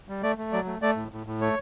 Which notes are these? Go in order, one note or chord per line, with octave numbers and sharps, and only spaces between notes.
G3
A3 D5
A3
F#3 D5
A3
A3 D5
A2
A2
A2
A3 C#5